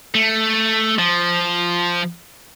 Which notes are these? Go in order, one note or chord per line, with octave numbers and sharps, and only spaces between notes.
A3
F3